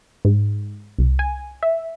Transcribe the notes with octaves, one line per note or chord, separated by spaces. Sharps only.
G#2
C2
G#5
E5